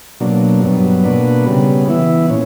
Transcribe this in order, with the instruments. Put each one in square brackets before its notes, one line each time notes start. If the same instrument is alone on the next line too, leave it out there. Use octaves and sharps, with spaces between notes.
[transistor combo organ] B2 F#3 A#3 D4
G2 F#3 B3
B2 A#3 D4 F#4 B4
C#3 G3 B3
E3 B3 E4
A#2 C#4